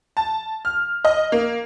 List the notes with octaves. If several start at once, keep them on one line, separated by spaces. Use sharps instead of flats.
A5
F6
D#5
A#3